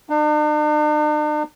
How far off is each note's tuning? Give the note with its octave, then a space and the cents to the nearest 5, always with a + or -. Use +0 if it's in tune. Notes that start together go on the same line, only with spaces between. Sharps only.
D4 +45